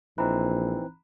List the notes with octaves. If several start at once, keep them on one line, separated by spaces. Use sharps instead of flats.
A#1 E3 C4 D#4 A#5 B5 F#6